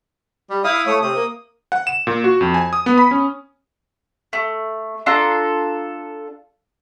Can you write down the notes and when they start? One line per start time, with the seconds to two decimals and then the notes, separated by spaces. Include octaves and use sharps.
0.50 G3
0.64 E4 F5 D#6
0.86 A3 C#5 D#6
1.02 C3 D#6
1.15 A#3
1.72 F#5
1.87 E7
2.07 A#2
2.24 F#4
2.41 F2
2.54 G#5
2.73 D#6
2.86 B3
2.98 B5
3.11 C#4
4.33 A3
5.06 D4 F4 A4 A#5